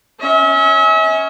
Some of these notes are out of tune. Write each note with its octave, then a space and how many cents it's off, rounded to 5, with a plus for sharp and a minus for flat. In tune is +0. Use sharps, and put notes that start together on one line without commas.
C#4 +0 E5 -40